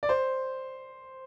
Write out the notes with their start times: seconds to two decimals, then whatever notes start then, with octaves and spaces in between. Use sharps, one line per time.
0.03 D5
0.09 C5